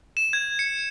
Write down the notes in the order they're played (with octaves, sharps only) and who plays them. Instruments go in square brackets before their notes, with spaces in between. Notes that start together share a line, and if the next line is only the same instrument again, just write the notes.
[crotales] E7
G#6
C#7